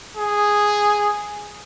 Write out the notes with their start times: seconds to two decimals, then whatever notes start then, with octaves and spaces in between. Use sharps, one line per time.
0.17 G#4